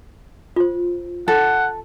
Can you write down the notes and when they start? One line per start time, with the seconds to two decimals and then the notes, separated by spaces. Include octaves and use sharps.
0.56 F4 C5
1.28 A4 F#5